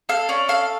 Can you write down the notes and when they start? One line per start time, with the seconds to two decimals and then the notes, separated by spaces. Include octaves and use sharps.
0.09 A4 F5
0.29 C#4 D5
0.48 A4 F5